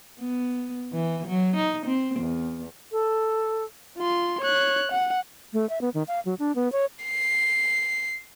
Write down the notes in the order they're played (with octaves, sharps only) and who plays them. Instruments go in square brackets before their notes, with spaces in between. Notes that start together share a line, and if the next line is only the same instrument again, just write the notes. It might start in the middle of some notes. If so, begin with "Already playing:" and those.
[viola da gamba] B3
E3
F#3
D#4
C4
E2
[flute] A4
[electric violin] F4 C6
C#5 F#6
F#5
[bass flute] A3
E5
B3
D#3
F5
F#3
D4
B3
C#5
[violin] C7